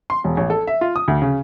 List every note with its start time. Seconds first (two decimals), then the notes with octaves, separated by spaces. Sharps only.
0.10 C6
0.24 E1
0.37 A1
0.50 A4
0.67 E5
0.81 F4
0.96 D#6
1.08 D2
1.22 C#3